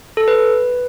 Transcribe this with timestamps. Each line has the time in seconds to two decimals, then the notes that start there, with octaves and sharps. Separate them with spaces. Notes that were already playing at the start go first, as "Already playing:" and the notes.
0.17 A4
0.28 B4